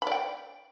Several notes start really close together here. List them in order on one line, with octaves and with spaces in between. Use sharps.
B5 D5 G5